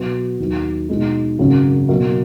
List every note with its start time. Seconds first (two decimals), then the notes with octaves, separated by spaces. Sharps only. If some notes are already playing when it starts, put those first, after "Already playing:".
Already playing: B2 F#3 B3 F#4 B4
0.39 D#2 D#3 F#3
0.89 B2 G#3 D#4
1.39 G#1 F#2 C#3 F#3 C#4
1.89 B2 F#3 A#3